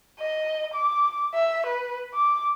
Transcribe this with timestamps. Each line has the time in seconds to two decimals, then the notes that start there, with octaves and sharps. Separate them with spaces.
0.20 D#5
0.74 D6
1.34 E5
1.66 B4
2.14 D6